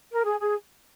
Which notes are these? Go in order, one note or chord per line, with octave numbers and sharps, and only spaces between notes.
A#4
G#4
G#4